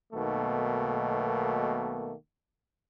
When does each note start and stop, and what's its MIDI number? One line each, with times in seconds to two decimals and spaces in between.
0.13 2.13 35
0.13 2.13 47
0.13 2.13 51
0.13 2.13 57
0.13 2.13 58